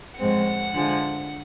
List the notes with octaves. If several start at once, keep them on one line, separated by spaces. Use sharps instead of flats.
A2 F3 G#3 C4 F#5
D3 F3 G#3